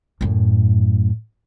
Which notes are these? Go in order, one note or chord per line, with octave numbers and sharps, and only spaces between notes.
F#2 A2